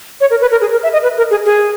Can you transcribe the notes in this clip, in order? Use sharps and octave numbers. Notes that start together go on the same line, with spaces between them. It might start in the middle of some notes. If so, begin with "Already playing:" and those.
C#5
A#4
B4
A#4
G#4
A#4
E5
D#5
B4
A#4
G#4
G#4